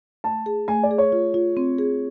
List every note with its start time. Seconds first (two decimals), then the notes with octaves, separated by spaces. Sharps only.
0.24 A3 A5
0.46 G#4
0.68 A3 G#5
0.83 D5
0.91 G#4
0.98 C#5
1.12 F4
1.34 F4
1.57 C4
1.78 G#4